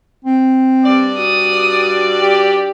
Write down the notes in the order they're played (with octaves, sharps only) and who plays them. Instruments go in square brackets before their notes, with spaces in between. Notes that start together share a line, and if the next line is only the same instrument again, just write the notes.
[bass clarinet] C4
[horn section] G2 G3 D5
[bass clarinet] F#4 [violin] D#6
[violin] G4